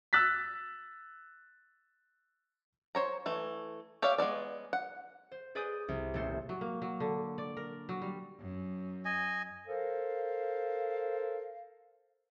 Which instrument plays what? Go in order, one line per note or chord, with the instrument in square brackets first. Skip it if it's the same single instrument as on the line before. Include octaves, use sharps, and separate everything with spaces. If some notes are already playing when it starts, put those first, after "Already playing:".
[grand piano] E6 F#6 A6 B6
[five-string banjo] C5 C#5 A#5
E3 A3
G4 C#5 D5 E5 F5
G#3 B3 E4 D5
F#5
[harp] C5
G#4 B4 D5 G#5 D#6 G6
C2
D#1 A3 C5
[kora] F#3
A#3
F#3
D3
D5
A#4
F#3
G3
[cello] F#2
[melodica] D#5 G#5
[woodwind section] A4 A#4 C5 F5